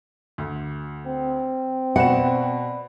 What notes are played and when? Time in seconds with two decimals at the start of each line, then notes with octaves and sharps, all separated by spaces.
0.38 D2
1.06 C4
1.96 B2 F#4 D5 F#5 B5 E7